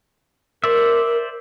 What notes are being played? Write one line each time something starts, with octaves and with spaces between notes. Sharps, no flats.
A#4 C5 D5 E5